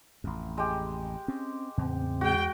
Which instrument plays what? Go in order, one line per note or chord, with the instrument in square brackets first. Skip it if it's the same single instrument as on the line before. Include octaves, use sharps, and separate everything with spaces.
[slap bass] A1 F2
[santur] G#3 G4
[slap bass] C4 C#4
[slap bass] E2 [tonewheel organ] A2 C#3 C4
[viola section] G#3 G5 [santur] F#4